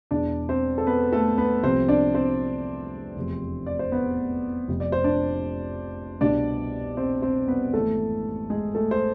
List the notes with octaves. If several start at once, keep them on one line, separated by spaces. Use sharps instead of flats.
E1 E2 B2 D4 D5
C4 C5
A4
B3 B4
A3 A4
B3 B4
C2 C3 F3 C4 C5
D4 D5
C4 C5
F1 E2 C3 F3
D5
C5
B3 B4
F1 F2 C3
D5
C5
D4 D5
C2 B2 D4 D5
C4 C5
C4 C5
B3 B4
G#1 G#2 E3 A3 A4
G#3 G#4
A3 A4
C5